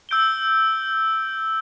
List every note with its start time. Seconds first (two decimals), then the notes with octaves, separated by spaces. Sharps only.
0.09 E6 G6 D7 G7